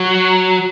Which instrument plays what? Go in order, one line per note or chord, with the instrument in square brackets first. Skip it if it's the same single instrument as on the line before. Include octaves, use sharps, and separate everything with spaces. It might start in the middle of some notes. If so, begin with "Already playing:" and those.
Already playing: [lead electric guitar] F#3